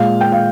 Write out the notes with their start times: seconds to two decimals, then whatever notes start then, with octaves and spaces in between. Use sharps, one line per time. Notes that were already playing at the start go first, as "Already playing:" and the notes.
Already playing: A#2 G#3 F5
0.21 G5
0.32 F5